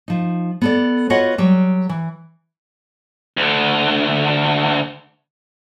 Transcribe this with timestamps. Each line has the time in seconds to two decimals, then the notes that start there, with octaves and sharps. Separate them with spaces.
0.08 F3 D#4
0.62 B3 A4 D5
1.10 F4 F#4 B4 C#5 D#5 F#5
1.38 F#3 G3 G4
1.89 E3
3.37 D2 D3